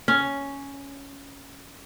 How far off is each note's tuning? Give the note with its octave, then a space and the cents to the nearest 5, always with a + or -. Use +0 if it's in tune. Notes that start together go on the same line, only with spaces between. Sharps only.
C#4 +5